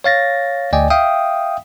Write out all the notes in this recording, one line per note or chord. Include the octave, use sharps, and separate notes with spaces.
C#5 F5 A6 A#6
D2 D5 D#5 G5 G#5
E5 F5 G5 D#6